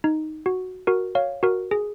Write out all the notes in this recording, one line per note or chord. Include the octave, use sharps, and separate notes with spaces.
D#4
F#4
F#4 A#4
C#5 F5
F#4 A#4
G#4